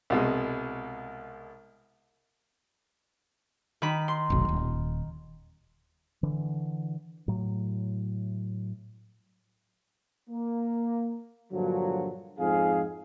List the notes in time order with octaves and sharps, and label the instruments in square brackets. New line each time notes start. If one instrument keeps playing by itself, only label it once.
[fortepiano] C2 B2 G#3
[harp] D#3 B5
C6
[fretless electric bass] F1 B1
D#1
[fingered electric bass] D3 E3
A2 F#3
[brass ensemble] A#3
G2 A#2 D3 F3 F#3
F2 G#2 G#4 F5